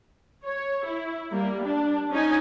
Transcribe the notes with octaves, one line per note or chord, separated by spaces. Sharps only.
C#5
E4
G3 A#3
D4
C#4 D#4 G#5